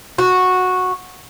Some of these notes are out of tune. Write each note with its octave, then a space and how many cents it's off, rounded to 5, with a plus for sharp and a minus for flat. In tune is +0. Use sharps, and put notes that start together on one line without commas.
F#4 -10